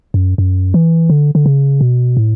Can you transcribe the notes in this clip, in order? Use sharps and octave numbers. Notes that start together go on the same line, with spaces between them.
F#2
F#2
E3
D3
D3
C#3
B2
A2